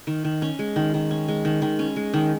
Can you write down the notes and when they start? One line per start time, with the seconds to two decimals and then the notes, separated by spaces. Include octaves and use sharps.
0.07 D#3
0.25 D#3
0.42 C#4
0.59 G#3
0.76 D#3
0.94 D#3
1.11 C#4
1.28 G#3
1.45 D#3
1.62 D#3
1.79 C#4
1.96 G#3
2.14 D#3